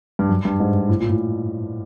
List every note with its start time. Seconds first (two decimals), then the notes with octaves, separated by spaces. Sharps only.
0.19 G2
0.29 F#2
0.45 G2
0.60 G#2
0.89 A2
1.00 A#2
1.09 A2